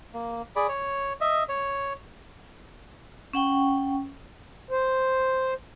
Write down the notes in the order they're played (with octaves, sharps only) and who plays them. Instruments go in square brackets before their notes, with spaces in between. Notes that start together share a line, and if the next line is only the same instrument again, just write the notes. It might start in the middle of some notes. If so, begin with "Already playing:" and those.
[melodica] A#3
G#4 D5 B5
C#5
D#5 E5
C#5
[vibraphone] C#4 F#5 G5 C#6
[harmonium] C5